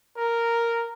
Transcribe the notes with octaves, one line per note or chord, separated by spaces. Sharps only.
A#4